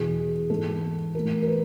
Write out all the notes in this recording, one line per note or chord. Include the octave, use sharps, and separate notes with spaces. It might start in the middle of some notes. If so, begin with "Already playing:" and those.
Already playing: E2 B2 G#4
G#2 E3 A4
A2 E3 A#4
A#4
B4